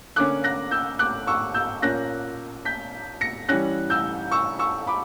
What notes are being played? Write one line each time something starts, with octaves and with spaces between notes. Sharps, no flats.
D3 A#3 C#4 D6 F#6
F#6 A#6
E6 G6
D6 F#6
C#6 E6
E6 G6
A#2 A#3 C#4 F#6 A#6
G6 B6
A#6 C#7
E3 G3 C#4 F#6 A#6
E6 G6
C#6 E6
C#6 E6
B5 D6